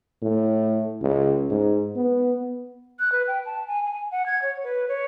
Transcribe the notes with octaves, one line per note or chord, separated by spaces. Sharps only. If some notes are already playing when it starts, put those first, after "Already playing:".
A2
C#2
G#2
B3
F#6
B4
G5
A5
G#5
G#5
F#5
G#6
C#5
B4
C#5